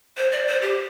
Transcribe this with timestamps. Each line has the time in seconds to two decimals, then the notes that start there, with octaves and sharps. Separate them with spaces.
0.17 C5
0.32 D5
0.47 C5
0.62 G4